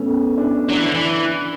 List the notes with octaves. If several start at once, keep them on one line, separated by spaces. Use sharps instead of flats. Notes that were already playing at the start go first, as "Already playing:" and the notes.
Already playing: A3 B3 C#4
D4
F#3 D4
E3
D3
E3